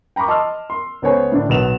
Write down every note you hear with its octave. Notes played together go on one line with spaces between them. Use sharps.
G5 A#5 B5 C#6 D6
D#5 A5 C6 D6 E6 F6
C6
C#2 B3 C5 C#5 G#5
A2 D3 D4
B1 B3 E7 F7